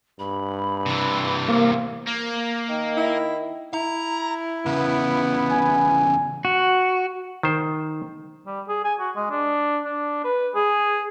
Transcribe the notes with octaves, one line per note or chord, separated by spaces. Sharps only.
G2 B5
C3 E3
A#3 C5
A#3
D#3
E4
E4 A#5
E2 C#3 B3
G#5
F#4
D#3 C5
G3
G#4
G#5
F#4
G#3
D4
D4
B4
G#4